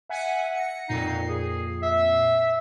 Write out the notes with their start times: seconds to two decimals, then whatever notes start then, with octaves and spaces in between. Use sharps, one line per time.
0.09 E5 F#5 G#5
0.55 A#6 C#7
0.89 F2 A#2 D#4 C7
1.29 G#4
1.83 E5